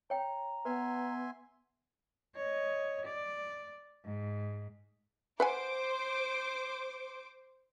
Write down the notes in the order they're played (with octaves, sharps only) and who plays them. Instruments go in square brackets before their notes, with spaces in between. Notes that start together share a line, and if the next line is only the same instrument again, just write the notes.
[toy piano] C#5 G5 [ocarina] A#5
[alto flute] B3 [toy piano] B4 [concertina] E5 G#5 C6
[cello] C#5 D#5
D5
G#2
[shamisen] B4 F#5 G#5 [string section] C5 D6